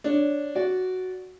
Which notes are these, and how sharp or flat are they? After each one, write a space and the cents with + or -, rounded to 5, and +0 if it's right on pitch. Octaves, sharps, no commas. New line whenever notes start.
D4 +0 C#5 +0
F#4 +0 D5 -15